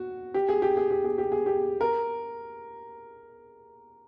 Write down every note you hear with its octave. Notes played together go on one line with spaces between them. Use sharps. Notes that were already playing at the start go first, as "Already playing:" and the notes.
Already playing: F#4
G4
G#4
G4
G#4
G4
G#4
G4
G#4
G4
A#4